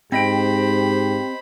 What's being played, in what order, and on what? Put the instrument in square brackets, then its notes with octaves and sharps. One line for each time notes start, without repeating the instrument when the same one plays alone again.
[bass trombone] G#2 [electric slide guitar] C4 D#5 G5 [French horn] G4 [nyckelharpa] C5 B5